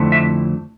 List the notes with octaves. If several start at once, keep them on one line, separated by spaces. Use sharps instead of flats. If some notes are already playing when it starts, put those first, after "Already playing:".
Already playing: F2 D3 A3 C4 E4
E5